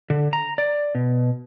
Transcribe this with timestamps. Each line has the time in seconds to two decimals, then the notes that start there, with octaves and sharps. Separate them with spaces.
0.10 D3
0.33 A#5
0.58 D5
0.95 B2